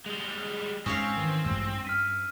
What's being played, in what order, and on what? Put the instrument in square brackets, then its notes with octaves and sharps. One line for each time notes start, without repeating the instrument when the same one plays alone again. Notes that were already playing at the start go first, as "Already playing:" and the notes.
[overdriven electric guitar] G3 G#3 [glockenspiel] F7 G7
[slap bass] G#2 [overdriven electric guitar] C4 [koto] C#4 C#5 F5 [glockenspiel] D#6 B6
[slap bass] D#3 E3
[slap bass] A1 G2 G#3 [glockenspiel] E6
[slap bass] G2 [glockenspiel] F6 B6 D#7